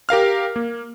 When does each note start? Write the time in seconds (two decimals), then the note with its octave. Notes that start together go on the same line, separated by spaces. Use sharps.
0.09 G4 A#4 F5 F6
0.56 A#3